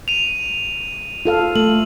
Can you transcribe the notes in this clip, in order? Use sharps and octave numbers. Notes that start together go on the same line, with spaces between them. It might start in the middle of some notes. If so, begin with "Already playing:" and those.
D#7 F7
F4 A4 F5
A3 F#7